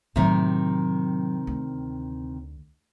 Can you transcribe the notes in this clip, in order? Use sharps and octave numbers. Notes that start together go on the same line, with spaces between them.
A2 C3 D#3 F#3
D2